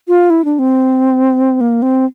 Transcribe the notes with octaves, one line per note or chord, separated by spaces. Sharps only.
F4
E4
D4
C4
A#3
C4